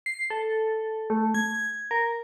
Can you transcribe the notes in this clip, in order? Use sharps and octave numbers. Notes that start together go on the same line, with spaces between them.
C7
A4
A3
G#6
A#4